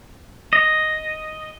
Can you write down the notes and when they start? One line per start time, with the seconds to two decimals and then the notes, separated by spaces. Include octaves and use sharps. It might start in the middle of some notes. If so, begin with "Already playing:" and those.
0.53 D#5